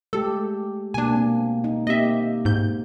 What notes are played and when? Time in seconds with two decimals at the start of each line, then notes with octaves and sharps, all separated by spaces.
0.13 G#3 A3 G4 A4
0.94 B2 A#3 D4 G#5
1.15 A#3 C4
1.64 D#4
1.87 A#3 C4 G4 D#5 E5
2.45 G#2 G6